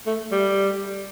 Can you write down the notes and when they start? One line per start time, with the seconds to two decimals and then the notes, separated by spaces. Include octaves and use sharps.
0.06 A3
0.31 G3